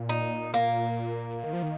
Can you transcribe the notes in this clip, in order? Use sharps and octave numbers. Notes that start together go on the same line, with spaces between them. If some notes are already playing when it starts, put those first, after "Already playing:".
Already playing: A#2
D#4
A#3
D#3
F3
D#3